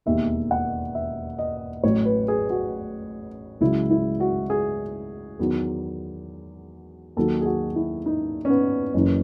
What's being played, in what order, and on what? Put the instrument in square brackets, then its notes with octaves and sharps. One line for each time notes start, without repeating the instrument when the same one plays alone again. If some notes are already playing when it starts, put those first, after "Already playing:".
[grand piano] E1 D#2 D#3 E5
F#5
E5
D#5
A1 A2 F#3 C#5
B4
G#4
F#4
C#2 C#3 F#3 E4
E4
F#4
G#4
E2 D#3 F#3
D#2 D#3 F#3 A4
G#4
F#4
E4
D#4
C#4
B3
F#1 F#2 E3 C#4